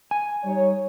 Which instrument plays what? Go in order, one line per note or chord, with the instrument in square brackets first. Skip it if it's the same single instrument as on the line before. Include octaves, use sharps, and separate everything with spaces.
[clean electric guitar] G#5
[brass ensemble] G3 D#4 C#5